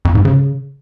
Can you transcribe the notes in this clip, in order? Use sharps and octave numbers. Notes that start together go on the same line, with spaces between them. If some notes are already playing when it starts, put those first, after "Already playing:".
F2
G#2
C#3